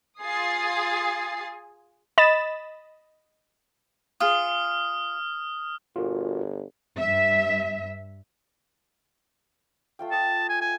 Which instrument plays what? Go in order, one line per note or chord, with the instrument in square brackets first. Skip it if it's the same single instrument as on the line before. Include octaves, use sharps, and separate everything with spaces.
[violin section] F4 G#4 G#5 D#6 A6 C7
[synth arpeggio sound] D#5 B5 A6 E7
[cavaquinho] F4 G#4 [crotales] D#6 F6
[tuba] G1 [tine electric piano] F4 F#4 A#4
[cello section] G2 E5
[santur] A3 F4 G5
[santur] D#5 D#6 [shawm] A5
[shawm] G#5
[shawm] G#5 [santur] E6